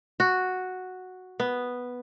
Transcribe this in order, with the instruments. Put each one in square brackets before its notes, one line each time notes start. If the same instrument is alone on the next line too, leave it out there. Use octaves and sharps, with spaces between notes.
[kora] F#4
B3